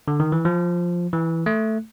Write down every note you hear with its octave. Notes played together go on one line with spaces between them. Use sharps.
D3
D#3
E3
F3
E3
A3